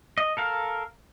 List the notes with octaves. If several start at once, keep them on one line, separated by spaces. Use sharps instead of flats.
D#5
A4 A#4 F5